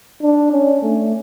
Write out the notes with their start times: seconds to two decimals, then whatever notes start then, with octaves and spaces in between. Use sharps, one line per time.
0.23 D4
0.52 C#4
0.82 A3